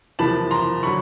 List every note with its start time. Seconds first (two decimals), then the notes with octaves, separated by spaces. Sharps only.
0.19 F#1 E2 C3 F3 A#3 A5 B5
0.51 A#5 C6
0.83 D3 F#3 B5 C#6